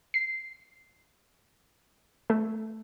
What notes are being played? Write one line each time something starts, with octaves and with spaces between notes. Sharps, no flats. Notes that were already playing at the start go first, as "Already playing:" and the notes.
C7
A3